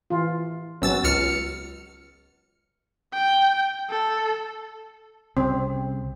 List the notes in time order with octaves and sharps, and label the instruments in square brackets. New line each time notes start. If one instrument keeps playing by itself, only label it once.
[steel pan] E3 F4
[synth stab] G#1 E6 A6 [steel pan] F#3 B3 C#4
[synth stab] C#2 F6 C#7
[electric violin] G5
A4
[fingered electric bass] C2 C#3 [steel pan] C4